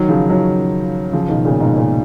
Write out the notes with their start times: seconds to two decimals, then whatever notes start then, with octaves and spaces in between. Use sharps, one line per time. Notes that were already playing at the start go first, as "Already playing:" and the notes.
Already playing: D#3 F#3
0.08 C#3 F3
0.29 D#3 F#3
1.13 C#3 F3
1.29 B2 D#3
1.45 A#2 C#3
1.60 G#2 B2
1.77 A#2